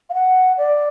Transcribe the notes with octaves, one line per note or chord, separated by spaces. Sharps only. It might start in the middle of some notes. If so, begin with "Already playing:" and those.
F5
F#5
D5